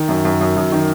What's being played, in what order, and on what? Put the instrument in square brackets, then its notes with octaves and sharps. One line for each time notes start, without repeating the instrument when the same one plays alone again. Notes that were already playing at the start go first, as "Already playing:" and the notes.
Already playing: [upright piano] D#3
F#2
F#2
F#2
F#2
D#3